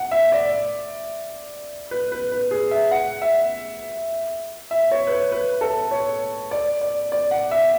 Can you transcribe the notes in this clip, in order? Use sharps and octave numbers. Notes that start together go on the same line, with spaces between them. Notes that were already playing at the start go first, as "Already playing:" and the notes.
Already playing: F#5
E5
D5
B4
B4
B4
G#4
E5
F#5
E5
E5
C#5
B4
C#5
B4
A4
C#5
D5
D5
D5
F#5
E5